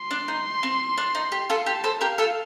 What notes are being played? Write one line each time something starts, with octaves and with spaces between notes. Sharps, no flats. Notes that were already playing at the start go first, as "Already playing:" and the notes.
Already playing: C6
D4
D#4
C4
D4
D#4
G4
F4 A4
G4 A5
A4 C5
G4 A#4 F5
F4 A4